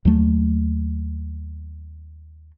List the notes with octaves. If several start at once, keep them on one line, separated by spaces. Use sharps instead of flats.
D#2 F#3 A3